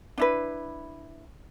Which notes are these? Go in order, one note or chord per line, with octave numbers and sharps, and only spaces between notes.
D4 E4 B4